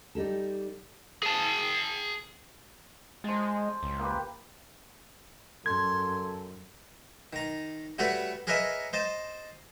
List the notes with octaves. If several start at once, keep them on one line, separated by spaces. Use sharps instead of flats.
G3 D#4 G4 A4
G#4 A5
G#3 C5 A5
C#2
A#3 G4 B4
F#2 A4 C6 G#6
D#3 A#5
G3 A3 F#4 A4 B4 C#5
G#4 A#4 B4 C#5 D#5 E5
C5 D#5 A5